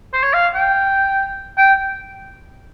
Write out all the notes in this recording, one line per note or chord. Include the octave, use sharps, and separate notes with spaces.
C5
C#5
F5
G5
G5